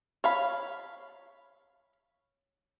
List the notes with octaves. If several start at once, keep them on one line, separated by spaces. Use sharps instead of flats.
C#5 F5 B5